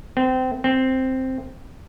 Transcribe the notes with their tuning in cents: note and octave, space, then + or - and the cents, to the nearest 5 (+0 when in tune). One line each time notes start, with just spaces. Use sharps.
C4 -25
C4 +0